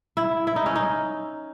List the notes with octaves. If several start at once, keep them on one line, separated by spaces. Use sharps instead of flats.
E4
E4
D#4
C#4
D#4